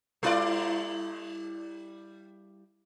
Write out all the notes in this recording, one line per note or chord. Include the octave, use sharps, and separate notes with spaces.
G3 E4 D5